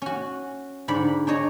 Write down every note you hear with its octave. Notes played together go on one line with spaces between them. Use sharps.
C#4 F#4
G#2 D3 B5
D4 D#4 C#5 A#5